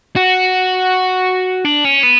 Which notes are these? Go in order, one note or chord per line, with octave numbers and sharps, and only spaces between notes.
F#4
D4
C#4
B3